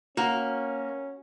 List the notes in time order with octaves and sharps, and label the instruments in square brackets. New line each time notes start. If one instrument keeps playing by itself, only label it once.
[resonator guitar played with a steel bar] A#3 [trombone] C#4 [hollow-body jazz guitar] F#4